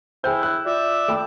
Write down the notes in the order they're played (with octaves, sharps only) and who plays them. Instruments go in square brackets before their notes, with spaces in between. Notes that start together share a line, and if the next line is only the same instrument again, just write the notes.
[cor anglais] E4 [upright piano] G#4 G6 [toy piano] C5 G5
[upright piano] F#6 G6
[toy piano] F4 [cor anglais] D5 [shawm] E5
[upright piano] A3 G5 [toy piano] A4 B5